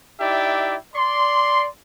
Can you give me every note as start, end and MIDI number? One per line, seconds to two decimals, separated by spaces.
0.20 0.75 63
0.20 0.75 64
0.20 0.75 67
0.20 0.75 74
0.20 0.75 76
0.94 1.66 74
0.94 1.66 84